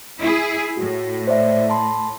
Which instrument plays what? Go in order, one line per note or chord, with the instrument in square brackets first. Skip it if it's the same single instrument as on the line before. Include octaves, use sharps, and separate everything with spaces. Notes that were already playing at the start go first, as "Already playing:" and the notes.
[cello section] E4 G#4
[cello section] A2 [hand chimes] F#4
[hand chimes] C5 D5 E5
A5 B5 C6